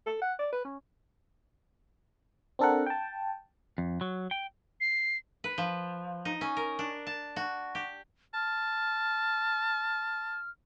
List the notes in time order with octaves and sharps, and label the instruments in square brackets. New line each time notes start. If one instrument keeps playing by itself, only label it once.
[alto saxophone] A4
F#5
D5
B4
C#4
[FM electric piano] C4 D4 A4 A#4 F#5
G5 A5
[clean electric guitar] F2
F#3
G5
[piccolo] C7
[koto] B4
F3
D#4
C#4
A#4
D4
A5
F#4
G4
[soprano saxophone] A5 [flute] F6